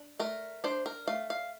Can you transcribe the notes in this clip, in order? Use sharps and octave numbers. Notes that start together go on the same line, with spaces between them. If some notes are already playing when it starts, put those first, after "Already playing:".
Already playing: D4
A3 A#4
D4 C5
A#4
A3 F5
F5